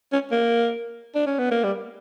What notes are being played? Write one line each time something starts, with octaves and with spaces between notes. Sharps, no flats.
C#4
A#3
D4
C#4
B3
A#3
G3